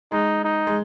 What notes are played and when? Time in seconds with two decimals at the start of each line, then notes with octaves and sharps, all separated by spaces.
0.12 G#3 D#4
0.45 D#4
0.67 G#3